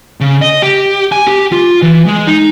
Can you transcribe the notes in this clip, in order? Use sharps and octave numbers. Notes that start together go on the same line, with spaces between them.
C#3
D#5
G4
G#5
G4
F4
E3
G#3
D#4